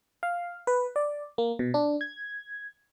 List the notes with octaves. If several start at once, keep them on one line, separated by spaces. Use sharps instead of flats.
F5
B4
D5
A#3
B2
D4
G#6